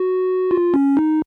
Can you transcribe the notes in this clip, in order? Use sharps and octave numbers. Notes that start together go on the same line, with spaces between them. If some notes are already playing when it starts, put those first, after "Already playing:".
Already playing: F#4
F4
C#4
D#4